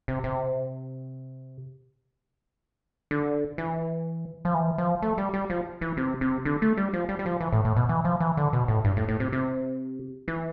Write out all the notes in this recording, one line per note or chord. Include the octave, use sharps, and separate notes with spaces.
C3
C3
D3
E3
F3
E3
F3
A3
G3
G3
F3
E3
C3
C3
D3
A3
G3
F3
G3
G3
F3
E3
A2
A2
B2
E3
F3
E3
D3
B2
A2
G2
A2
A2
C3
C3
E3